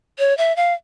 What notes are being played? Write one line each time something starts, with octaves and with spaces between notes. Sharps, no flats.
C#5
E5
F5